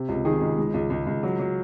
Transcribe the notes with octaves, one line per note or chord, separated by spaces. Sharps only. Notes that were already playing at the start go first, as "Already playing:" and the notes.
Already playing: C3
C#2
D#3 G#4
C#2
G#3
C#2
C#2
C#2
F#3
F#3